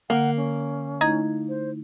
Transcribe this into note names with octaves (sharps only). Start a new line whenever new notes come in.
D3 A#3 F#5
C#4
A3 D#4 E4 D#5 A#5 G#6
C5